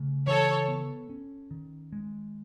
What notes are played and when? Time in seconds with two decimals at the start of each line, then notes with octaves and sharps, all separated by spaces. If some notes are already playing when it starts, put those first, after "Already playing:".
Already playing: C#3 A3
0.26 E3 A4 C#5
0.68 B3
1.10 C#4
1.51 D#3
1.93 G#3